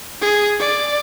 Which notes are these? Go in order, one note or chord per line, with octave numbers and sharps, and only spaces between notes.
G#4
D5